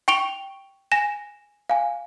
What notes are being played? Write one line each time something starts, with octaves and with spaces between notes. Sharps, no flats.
G5 C#6 D7 F7 G7
G#5 A#6 E7
F5 G#5